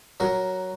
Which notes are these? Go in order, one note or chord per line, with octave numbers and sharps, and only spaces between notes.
F#3 F#4 A#4